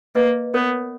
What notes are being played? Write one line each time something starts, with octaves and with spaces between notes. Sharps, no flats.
A#3 B4 D#5
B3 A#4 C#5